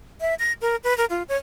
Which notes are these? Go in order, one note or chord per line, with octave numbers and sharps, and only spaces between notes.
E5
A#6
A#4
B4
A#4
F4
C#5